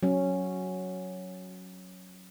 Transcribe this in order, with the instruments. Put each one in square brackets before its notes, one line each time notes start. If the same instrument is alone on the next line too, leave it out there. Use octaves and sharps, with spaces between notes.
[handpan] F#3 C#4